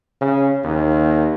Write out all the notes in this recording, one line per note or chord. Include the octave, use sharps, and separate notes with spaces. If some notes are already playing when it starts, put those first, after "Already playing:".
C#3
D#2